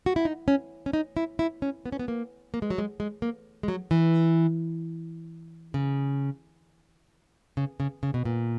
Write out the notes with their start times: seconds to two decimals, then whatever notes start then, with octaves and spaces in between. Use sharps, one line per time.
0.06 F#4
0.16 E4
0.25 D#4
0.48 C#4
0.86 C#4
0.93 D#4
1.17 E4
1.39 E4
1.62 C#4
1.86 B3
1.92 C#4
1.99 B3
2.08 A#3
2.54 A#3
2.62 G#3
2.70 F#3
2.78 G#3
3.00 G#3
3.22 A#3
3.63 G#3
3.68 F#3
3.91 E3
5.74 C#3
7.57 C#3
7.80 C#3
8.03 C#3
8.14 B2
8.25 A#2